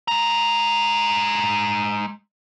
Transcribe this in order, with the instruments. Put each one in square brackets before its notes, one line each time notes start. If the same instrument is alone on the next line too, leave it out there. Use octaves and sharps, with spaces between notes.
[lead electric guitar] G#3 A#5